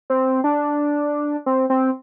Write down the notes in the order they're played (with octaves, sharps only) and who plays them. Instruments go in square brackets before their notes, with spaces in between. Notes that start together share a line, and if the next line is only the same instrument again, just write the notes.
[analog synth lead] C4
D4
C4
C4